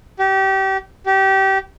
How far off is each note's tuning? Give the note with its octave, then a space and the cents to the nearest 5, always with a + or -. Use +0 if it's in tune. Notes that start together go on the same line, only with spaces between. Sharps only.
G4 -30
G4 -25